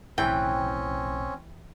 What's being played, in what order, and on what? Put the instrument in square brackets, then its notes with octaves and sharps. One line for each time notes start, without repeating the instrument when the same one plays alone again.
[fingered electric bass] B1 A2 [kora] E3 E4 B4 [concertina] C4 C#4 [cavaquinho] G5